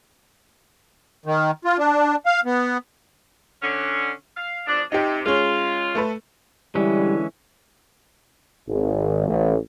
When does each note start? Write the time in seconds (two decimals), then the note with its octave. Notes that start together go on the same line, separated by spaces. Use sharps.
1.26 D#3
1.65 F4
1.79 D4
2.26 F5
2.45 B3
3.62 D3 C#4
4.37 F5
4.67 E2 F3 D4
4.92 C3 D#4 G4
5.26 G#3 C#4 F4
5.95 A3 A4 B4
6.75 D3 E3 G3 G#3 C#4 E4
8.68 G#1
9.28 A1